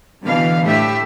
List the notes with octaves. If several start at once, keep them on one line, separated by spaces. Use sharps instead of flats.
B2 D3 E3 F5
A2 A3 G4 E5